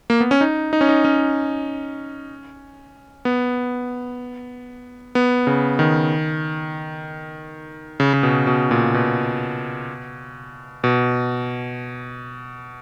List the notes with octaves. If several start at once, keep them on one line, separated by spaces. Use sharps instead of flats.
A#3
B3
C#4
D#4
D#4
C#4
D#4
C#4
B3
B3
C#3
D#3
C#3
C#3
B2
B2
A#2
B2
B2